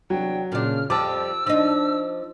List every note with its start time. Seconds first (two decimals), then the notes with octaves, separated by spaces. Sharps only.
0.10 E2 C3 F#3 D4 G5
0.52 A#2 C#3 D4 F6
0.90 F2 F3 G3 A5 D6 E6
1.47 F3 D4 D#4